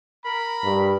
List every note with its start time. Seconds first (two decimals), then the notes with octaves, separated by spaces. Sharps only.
0.24 A#4 B5
0.63 G2